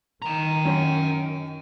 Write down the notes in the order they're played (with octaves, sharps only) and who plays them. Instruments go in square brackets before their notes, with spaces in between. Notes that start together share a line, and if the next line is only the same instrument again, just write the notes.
[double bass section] D#3 [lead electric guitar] G5 A#5
[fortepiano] F#2 C#4